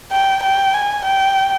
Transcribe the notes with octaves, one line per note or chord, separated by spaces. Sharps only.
G5
G5
G#5
G5